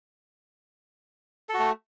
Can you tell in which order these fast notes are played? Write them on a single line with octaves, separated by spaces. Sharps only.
A4 F#4 A3